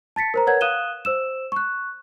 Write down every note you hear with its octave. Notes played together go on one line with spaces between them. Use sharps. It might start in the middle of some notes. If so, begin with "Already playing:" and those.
A5 A6 B6 C#7
A#4 C5 A#5
A#4 B4 C#5 F#5 G#6
F5 D#6 F#6 D#7 E7 G7
C5 E6 E7
C#6 F#6